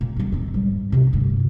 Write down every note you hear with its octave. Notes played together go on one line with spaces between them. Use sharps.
A#2
G1 G2
D#3 C4
G#2 G3
C3 C#4
D2 G2